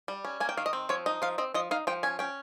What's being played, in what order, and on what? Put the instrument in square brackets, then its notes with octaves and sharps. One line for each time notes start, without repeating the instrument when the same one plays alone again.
[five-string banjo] G3
C#4
A#3 G#5
G5
D#3 F5
D#5
C4
F3 C#5
D#4 D#5
F3 F5
C4 D#5
F3 D#5
D#4 F5
F3 G5
C#4 G#5
C#4 G5